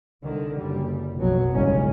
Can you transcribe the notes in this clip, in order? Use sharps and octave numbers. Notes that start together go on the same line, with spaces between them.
C2 D3 D#3
F#1 G3
F1 A#1 B2 F#3
G1 C2 G#2 C#3 G#3 C#4